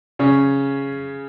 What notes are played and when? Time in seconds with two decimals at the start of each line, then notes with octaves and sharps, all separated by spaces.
0.19 C#3 C#4